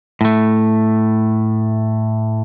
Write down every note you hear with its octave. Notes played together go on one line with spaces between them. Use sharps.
A2 A3